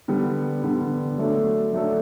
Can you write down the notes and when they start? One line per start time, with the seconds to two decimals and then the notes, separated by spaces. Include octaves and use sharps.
0.08 D3 G3 B3
0.63 D3 G3 B3
1.18 F#3 A3 D4 A4
1.73 F#3 A3 D4 A4